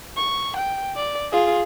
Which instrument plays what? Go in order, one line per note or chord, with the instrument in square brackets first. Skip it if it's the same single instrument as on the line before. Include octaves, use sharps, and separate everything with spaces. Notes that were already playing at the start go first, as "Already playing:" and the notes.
[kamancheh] C#6
G5
D5
F4 G#4